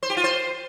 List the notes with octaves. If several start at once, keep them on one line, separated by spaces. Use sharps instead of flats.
C5
G4
F4
C5